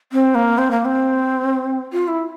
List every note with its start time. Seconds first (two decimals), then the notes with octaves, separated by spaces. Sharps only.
0.13 C4
0.35 A#3
0.58 C4
0.71 A#3
0.85 C4
1.93 F4
2.08 E4